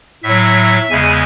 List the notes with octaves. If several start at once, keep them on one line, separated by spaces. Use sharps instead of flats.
A2 F#3 E5
E2 C#3 G#3 G#5